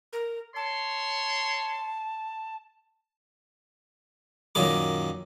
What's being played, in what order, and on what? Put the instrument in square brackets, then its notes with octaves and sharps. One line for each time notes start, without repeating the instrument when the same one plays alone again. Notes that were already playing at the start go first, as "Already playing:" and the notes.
[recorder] A#4
[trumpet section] C#5 C6 [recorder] A5
[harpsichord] F#2 A#2 D#3 A#4 D6